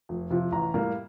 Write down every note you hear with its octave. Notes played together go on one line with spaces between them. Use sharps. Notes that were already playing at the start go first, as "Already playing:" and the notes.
F1
F2 C3 F3
A1 A#5
A2 G3 A#3